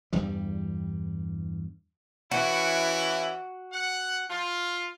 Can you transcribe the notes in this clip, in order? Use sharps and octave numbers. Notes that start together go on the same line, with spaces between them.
E2 G2 G3
E3 C#4 E4 F#4
F#5
F4